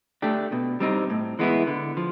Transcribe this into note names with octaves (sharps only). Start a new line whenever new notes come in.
A3 D4 G4
B2
G3 C4 D#4
A2
E3 G#3 B3 E4
D3
F3